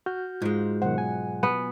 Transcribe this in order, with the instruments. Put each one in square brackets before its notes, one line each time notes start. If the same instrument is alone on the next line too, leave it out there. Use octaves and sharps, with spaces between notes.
[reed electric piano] F#4 F6 G6
[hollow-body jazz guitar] G#2 G#3 [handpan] F4
[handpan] B2 F#3 F#5 [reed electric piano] D#3 C5
[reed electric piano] G#5
[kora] B3